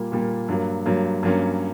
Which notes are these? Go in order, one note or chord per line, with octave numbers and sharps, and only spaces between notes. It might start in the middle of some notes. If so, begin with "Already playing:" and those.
Already playing: A#2 G3 A#3
A#2 G3 A#3
G2 F#3 A#3
G2 F#3 A#3
G2 F#3 A#3 C#4